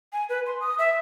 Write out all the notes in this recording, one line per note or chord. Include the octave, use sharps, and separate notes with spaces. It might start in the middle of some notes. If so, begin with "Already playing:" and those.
G#5
B4
C6
D#6
E5